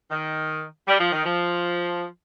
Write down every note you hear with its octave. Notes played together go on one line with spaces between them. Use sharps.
D#3
G3
F3
D#3
F3